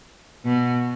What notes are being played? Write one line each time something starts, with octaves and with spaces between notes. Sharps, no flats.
B2